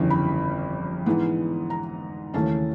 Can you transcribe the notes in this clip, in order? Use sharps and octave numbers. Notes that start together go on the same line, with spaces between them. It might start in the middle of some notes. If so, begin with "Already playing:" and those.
Already playing: G1 F2 C#3 E3 G3
B5
G#2 E3 G#3 B3
A#5
D#2 C#3 E3 A3 C#4 A5